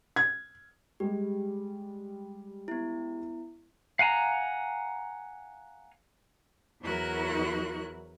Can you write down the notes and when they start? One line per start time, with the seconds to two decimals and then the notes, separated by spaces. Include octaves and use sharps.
0.16 G#6
1.00 G3 G#3 G4
2.68 B3 E4
3.99 F5 F#5 G#5 A#5
6.82 E2 F#3 E4 F#4 A#4 F#6